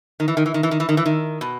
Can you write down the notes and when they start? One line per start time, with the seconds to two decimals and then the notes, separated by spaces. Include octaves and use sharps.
0.20 D#3
0.28 E3
0.37 D#3
0.46 E3
0.54 D#3
0.63 E3
0.71 D#3
0.80 E3
0.89 D#3
0.97 E3
1.06 D#3
1.41 B2